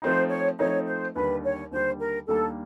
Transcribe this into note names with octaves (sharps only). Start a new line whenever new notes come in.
F3 A3 C4 D#4 C5
C#5
F3 A3 C4 D#4 C#5
C5
D#2 D3 G3 B4
C#5
D#2 D3 G3 C5
A#4
D#2 D#3 G3 A#3 D4 A4